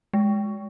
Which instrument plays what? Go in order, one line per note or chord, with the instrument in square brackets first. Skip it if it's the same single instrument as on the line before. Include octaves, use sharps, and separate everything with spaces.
[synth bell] G#3